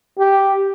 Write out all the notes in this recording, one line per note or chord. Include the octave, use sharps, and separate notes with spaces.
G4